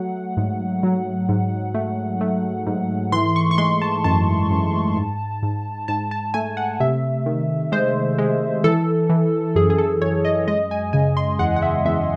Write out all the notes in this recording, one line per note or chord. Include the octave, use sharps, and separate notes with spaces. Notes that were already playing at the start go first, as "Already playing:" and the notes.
Already playing: F#3 A3 F#5
G#2
F#3
G#2
A3
A3
G#2
E3 C6
C#6
C#6
G#3 C6
A5
F#2 A5
F#2
G#2
G#2
G#2 A5
A5
A3 G#5
F#5
C3 E5
D#3
G#3 C5
G#3
E3 A4
E3
F#2 G#4
G#4
A4
F#2 C#5
D#5
G#3 D#5
G#5
C#3 G#5
C6
E2 F#5
F#5
E5
E2 E5